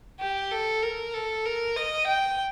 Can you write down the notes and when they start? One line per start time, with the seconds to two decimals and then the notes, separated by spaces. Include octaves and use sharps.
0.20 G4
0.51 A4
0.82 A#4
1.14 A4
1.45 A#4
1.76 D#5
2.07 G5